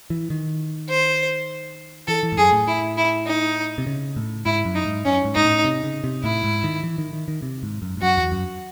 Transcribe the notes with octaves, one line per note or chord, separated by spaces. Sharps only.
E3
D#3
C5
E3 A4
E3
G#2
F#2 G#4
A2
E4
E4
D#4
C3
C#3
A2
G#2 E4
F#2
D#4
G#2
F#2 C#4
G#2
G#2 D#4
A2
C3
C#3
C3
A2 E4
G#2
D#3
E3
D#3
D#3
D#3
C3
G#2
F#2
G#2
F#2 F#4
E2
F#2